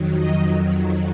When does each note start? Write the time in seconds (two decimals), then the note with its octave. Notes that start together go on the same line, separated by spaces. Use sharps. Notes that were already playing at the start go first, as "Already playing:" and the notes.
Already playing: F2 D#3 F#3
0.15 D#5